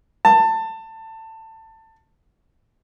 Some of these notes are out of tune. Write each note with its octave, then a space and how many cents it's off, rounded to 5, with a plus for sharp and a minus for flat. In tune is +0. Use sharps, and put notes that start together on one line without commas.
A5 +20